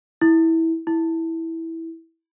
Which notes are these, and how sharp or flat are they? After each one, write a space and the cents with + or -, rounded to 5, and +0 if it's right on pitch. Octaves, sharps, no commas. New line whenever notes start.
E4 -15
E4 -10